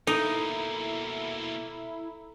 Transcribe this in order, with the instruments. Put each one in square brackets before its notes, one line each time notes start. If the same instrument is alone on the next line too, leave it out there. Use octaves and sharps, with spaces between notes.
[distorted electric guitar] B2 A#3 [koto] D#4 [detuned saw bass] E4 [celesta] A4 A#5